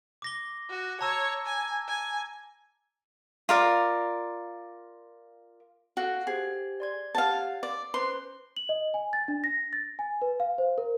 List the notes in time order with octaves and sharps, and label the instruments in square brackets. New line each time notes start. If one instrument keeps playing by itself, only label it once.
[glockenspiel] D6 A#6 G7
[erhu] F#4
[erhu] C#5 [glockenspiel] A5 A#5 E6
[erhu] G#5
G#5
[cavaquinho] F4 A#4 D5
[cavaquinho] F#4 [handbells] A4 F5 F#5
[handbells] G4 C5 [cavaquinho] G#4
[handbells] D5 C6 G#6
[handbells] G4 C#5 F#5 [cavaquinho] F5 A5
[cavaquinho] D5 [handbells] C6
[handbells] C#4 B4 C5 [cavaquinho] C6
[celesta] F#7
D#5
G#5
A6
D4
A#6
A6
G#5
B4
F5
C5
A#4